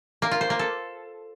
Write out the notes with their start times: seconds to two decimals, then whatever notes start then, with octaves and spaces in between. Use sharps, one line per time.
0.22 A#3
0.31 F4
0.41 C5
0.50 A#3
0.59 A4